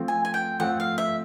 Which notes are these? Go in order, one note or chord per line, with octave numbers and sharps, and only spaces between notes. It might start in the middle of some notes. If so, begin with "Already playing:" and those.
Already playing: F3 A3 C4
G#5
G#5
G5
F3 A3 C4 F#5
F5
E5